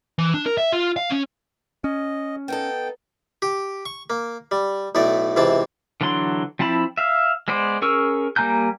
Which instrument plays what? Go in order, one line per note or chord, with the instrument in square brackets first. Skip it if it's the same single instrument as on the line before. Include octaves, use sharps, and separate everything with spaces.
[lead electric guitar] E3
D4
A#4
E5
F4
F5
C#4
[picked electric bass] C#4 [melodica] D#5
[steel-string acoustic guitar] B3 D#4 A4 [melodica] G5
[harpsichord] G4
C#6
A#3
G3
B1 A2 A3 D5
C#2 C3 E3 C4 A5
[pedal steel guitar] D3 E3 F#3 D4 C6
F3 C4 E4 A5 B5
E5 F5
G#3 B3 C5 D5
C#4 G#4 A#4 C#6 E6
G3 A#3 G#5 A#5 G6